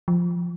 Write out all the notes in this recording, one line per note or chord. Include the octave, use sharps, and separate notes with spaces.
F3